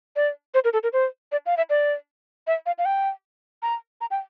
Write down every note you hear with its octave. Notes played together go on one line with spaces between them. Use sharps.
D5
C5
A#4
A4
A#4
C5
D5
F5
E5
D5
E5
F5
F5
G5
A#5
A#5
G5